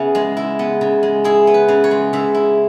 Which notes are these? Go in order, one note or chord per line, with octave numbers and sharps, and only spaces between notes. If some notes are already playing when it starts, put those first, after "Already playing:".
Already playing: C#3 B3 E4 G#4 B4
G#3
E4
B3
C#3
G#3
E4 G#4
B3
B4
C#3
C#5
G#3
C#3 E5
E4